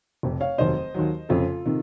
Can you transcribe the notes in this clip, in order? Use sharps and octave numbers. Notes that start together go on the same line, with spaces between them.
F1 F2 C3
C#5 F5
F1 D#2 D#3 F#3 C5 D#5
D#2 D#3 F#3
F1 F2 C#3 F4 A4
C3 D#3